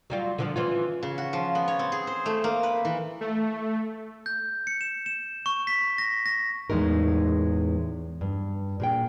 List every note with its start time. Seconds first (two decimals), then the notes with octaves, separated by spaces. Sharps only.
0.10 F#3 G3 F4
0.38 D3 E3 F3
0.56 E3 C#4 F4
1.03 C#3
1.18 F#4
1.33 F3
1.55 B3
1.68 C#5
1.79 C4
1.92 G#4
2.07 C5
2.26 A3
2.44 A#3
2.63 B4
2.85 E3
3.21 A3
4.26 G6
4.67 C#7
4.81 E7
5.06 E7
5.46 C#6
5.67 B6
5.98 A#6
6.26 A#6
6.70 E2 A2 G#3 D#4 A#4
8.21 G2
8.80 A#2 G#4 G5